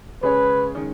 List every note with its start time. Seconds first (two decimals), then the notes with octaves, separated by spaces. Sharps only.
0.23 C#3 G#3 C#4 G#4 B4 C#5
0.75 D#3 G#3 C#4